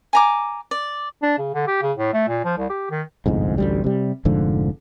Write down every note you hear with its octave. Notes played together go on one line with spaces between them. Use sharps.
G#5 A#5 D6
D5
D4
C#3
D3
G4
C#3
A2
A3
A#2
F3
C2
G4
D#3
G1 C2 F2 G#2
A1 D2 G3
C3 G3
F1 G#2 D3 F3